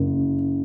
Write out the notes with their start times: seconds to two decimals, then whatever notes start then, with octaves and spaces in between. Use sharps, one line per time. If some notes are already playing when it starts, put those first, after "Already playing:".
Already playing: F#1